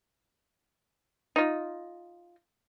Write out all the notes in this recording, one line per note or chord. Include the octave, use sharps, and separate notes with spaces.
D#4 F4